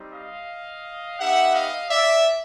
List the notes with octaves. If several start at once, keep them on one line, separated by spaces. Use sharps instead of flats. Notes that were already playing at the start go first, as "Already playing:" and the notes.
Already playing: G3 C4 D#4 G4
D#5 F5
B3 D#4 G4 E5 F#5
D#5 F5
D5 E5